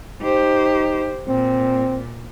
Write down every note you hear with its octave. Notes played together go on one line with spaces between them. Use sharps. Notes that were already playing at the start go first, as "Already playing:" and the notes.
D#4 G4 C5
A#2 C4